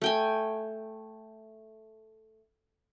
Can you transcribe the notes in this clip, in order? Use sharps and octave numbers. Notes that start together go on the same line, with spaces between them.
A3 G5 G#5